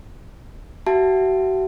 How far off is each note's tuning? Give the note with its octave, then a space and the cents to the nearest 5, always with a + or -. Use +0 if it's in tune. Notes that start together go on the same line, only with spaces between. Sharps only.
F#4 +40 E5 +45 A5 +0